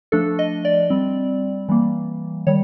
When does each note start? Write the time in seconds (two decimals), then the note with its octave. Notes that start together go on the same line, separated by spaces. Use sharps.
0.12 F3 A3 D4 A4
0.39 D#5
0.65 D5
0.90 G3 C4
1.69 E3 G3 A#3
2.47 D#3 G3 C#5